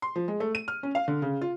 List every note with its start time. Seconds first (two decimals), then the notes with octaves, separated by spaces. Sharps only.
0.02 C6
0.16 F3
0.28 G#3
0.40 A3
0.55 D#7
0.68 F6
0.83 C#4
0.95 F5
1.08 D3
1.22 C#3
1.41 F4